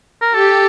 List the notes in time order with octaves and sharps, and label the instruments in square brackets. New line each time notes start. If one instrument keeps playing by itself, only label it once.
[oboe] A#4
[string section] G4 [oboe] A4